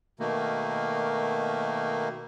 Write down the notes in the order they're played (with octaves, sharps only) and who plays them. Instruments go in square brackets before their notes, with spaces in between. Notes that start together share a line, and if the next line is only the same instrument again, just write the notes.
[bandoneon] B2 D#3 A3 A#3